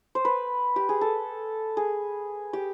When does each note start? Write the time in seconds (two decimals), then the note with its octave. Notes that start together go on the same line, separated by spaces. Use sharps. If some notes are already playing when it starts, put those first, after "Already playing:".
0.15 C5
0.25 B4
0.76 G4
0.89 G#4
1.01 A4
1.77 G#4
2.53 G4